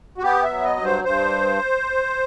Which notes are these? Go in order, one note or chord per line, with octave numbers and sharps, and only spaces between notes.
F#4
B3 G4
E5
F#3
D#5
G2
C5
G2 C5